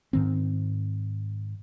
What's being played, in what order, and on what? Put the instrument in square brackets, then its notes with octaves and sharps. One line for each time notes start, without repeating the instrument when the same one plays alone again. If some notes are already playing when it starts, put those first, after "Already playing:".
[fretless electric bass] G#2 D#3 C4